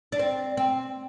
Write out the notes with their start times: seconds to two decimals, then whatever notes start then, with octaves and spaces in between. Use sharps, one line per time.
0.12 D4
0.19 C4
0.57 C4